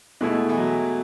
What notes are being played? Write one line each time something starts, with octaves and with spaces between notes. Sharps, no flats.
B2 G#3 A3 E4
E3
F#3